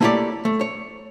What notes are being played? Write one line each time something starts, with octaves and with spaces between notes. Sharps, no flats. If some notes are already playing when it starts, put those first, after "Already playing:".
A3 A#3 E4 G4 C#5 D5
A3
C#5